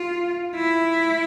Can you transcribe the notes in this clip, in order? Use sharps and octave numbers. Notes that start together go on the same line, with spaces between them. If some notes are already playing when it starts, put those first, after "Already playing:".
Already playing: F4
E4